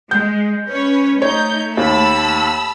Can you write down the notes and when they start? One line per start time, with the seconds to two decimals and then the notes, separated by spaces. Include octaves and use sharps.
0.11 G#3 G6
0.69 C#4 B4 C#5
1.22 A3 D#4 C#5 G6
1.77 D#2 A5 B5 E6